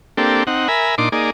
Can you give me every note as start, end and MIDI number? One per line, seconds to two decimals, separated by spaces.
0.17 0.44 58
0.17 0.44 60
0.17 0.44 62
0.17 0.44 67
0.17 0.44 69
0.47 0.68 60
0.47 0.68 63
0.47 0.68 78
0.68 0.95 70
0.68 0.95 76
0.68 0.95 80
0.68 0.95 83
0.98 1.09 46
0.98 1.09 62
0.98 1.09 63
0.98 1.09 84
0.98 1.09 86
1.12 1.30 58
1.12 1.30 63
1.12 1.30 68
1.12 1.30 74